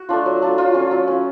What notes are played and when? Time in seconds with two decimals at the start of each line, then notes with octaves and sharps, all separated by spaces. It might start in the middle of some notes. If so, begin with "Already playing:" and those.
Already playing: F#4
0.09 A3 D4 F4
0.26 F#3
0.42 A3 D4 F4
0.58 F#3 F4
0.74 C#4 F4
0.91 F#3
1.08 C#4 F4